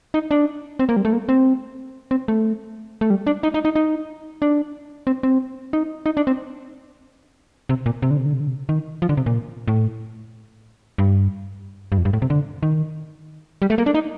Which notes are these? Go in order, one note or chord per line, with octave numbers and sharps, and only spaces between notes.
D#4
D4
C4
A#3
G3
A3
A#3
C4
C4
A3
A3
G3
D4
D#4
D#4
D#4
D#4
D4
C4
C4
D#4
D#4
D4
C4
C3
A#2
C3
D3
C3
D3
C3
D3
C3
D#3
F3
D3
C3
A#2
A2
G2
G2
F2
G2
A2
C3
D3
D#3
G3
A3
A#3
D4
D#4